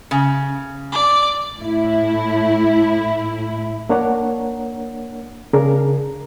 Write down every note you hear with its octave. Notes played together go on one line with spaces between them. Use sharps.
C#3
D5
A2 E4
A#3 D4 A#4 C#5 F#5
C#3 D4 G#4 A#4